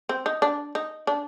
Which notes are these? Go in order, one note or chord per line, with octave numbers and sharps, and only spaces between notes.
C4
D#4
D4
D#4
D4